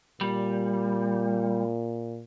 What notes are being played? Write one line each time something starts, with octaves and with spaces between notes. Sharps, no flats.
A#2 G3